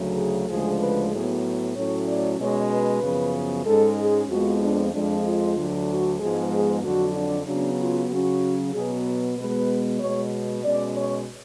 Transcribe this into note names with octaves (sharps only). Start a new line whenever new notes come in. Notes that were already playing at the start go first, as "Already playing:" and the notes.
Already playing: D2 C#3 F#3 A3
G#4
D2 C#3 F3 G#3 G#4
B4
A2 F#3 B3 G#4
A2 F#3 A3 C#4 C#5
D5
B2 G#3 C#4 C#5
B4
F#2 C#3 F3 B3
G#2 G#3 C#4 A4
G#4
F2 F3 G#3 B3 F#4
D4
F2 F3 G#3 D4
F4
D2 D3 F#3
F#4
G#2 F3 G#3 B3 G#4
G#4
F2 D3 F#3 F#4
D4
C#3 F#3 B3 D4
F4
C#3 F#3 C#4 F#4
B2 F#3 B3 G#4
B2 G#3 B3 B4
B2 G#3 B3 C#5
B2 G#3 C#4 D5
C#5